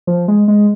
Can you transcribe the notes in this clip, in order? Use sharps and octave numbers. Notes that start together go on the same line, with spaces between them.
F3
G#3
G#3